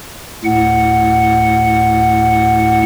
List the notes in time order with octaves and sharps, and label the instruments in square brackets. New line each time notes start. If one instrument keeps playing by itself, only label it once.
[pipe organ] D2 A2 F#5